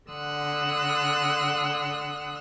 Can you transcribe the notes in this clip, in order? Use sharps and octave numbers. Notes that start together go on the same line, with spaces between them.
D3 F#5 C6 D#6 E6 F#6